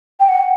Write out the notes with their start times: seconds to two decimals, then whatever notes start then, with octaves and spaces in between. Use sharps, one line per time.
0.19 G5
0.28 F#5